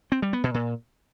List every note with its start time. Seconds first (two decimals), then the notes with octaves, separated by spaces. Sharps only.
0.12 C4
0.22 G3
0.33 B3
0.44 B2
0.54 A#2